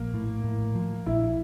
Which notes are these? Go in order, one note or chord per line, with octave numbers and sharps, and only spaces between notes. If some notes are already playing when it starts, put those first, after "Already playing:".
Already playing: A#1 A#3
A2
A2
F3
A#1 E4